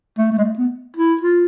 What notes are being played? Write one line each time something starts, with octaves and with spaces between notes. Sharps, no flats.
A3
A3
G#3
A3
B3
E4
F4